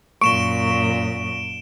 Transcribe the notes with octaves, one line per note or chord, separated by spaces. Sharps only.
F#2 A#2 C#6 D7 E7 G7